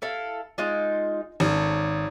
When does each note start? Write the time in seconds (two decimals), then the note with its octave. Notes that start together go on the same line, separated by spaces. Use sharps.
0.02 E4 A4 F5
0.58 G#3 D#4 F4
1.40 G#1 C#4 A4